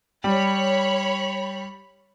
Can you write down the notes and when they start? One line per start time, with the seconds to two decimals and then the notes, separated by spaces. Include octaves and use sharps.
0.24 G3 C#5 B5